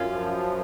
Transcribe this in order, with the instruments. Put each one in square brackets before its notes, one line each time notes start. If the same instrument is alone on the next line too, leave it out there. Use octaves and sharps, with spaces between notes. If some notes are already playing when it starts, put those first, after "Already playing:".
Already playing: [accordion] F#2 [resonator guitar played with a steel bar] C#4 F4
[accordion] F3